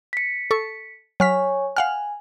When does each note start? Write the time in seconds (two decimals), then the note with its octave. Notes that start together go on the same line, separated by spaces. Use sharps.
0.13 B6 C#7
0.51 A4 C#6
1.20 F#3 C#5 G#5 C#6 F6 B6
1.77 F5 F#5 G#5 F6